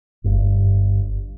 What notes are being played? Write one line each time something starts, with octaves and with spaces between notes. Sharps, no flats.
G1 G2